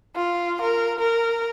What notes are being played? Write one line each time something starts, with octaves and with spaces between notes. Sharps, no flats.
F4
A#4
A#4